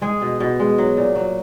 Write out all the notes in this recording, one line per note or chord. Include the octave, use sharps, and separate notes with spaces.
G#3 G#4
B2
B2
G#3
F#3
A#2
F#3